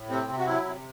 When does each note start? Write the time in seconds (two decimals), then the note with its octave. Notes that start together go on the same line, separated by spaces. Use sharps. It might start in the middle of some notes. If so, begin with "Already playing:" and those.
Already playing: A2
0.09 C3 C4
0.28 C3
0.38 F#4
0.46 F#3 E4
0.64 C3